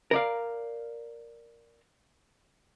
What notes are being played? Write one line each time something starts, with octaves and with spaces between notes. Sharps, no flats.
A#4 D5 F5